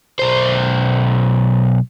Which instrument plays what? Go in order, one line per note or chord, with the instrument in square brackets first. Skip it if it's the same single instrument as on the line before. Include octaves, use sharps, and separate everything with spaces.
[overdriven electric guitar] B1 C5